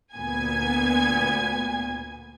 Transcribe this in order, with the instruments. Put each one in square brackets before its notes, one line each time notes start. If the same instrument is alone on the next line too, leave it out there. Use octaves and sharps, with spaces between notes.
[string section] D2 A#2 B3 G#5 G#6